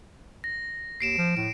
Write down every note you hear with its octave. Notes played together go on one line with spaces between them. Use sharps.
A#6
D#2 C7 D7 E7
F3
A2 D7